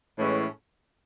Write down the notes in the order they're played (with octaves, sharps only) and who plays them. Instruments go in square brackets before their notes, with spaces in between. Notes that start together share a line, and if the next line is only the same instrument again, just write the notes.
[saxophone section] A2 E3 G#3 C#4